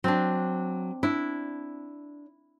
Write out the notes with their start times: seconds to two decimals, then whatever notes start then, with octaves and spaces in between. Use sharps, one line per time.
0.04 F#3 C4 D4
1.03 D4 E4